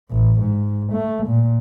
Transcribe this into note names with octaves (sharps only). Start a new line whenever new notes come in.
A1
G#2
A3
A#2